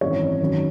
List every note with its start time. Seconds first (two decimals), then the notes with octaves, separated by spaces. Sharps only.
0.01 G#1 F#2 E3 C4 C#5
0.40 F#2 D#3 F#3